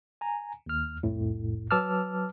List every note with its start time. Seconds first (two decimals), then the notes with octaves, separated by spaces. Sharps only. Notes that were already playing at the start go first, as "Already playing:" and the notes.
0.21 G#5 A#5
0.66 D#2 F6
1.03 C2 F2 A2
1.71 F#3 B4 A5 D6 E6 F6